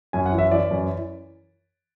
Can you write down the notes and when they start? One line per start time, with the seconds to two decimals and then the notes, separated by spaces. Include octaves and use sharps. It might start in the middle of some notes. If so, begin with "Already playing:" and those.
0.13 F#2 G#5
0.26 F#5
0.32 E3
0.38 E5
0.51 E3 D5
0.71 F#2